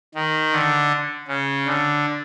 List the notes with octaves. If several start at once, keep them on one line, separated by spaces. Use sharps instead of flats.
D#3
D3
C#3
D3